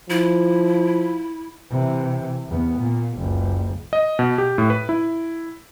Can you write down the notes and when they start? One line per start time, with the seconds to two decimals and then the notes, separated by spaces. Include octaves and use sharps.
0.10 F3 E4
1.70 C3 E3
2.49 E2 B3
2.80 A#2
3.19 F#1 C#2
3.93 D#5
4.19 B2
4.38 G4
4.58 A2
4.70 B4
4.89 E4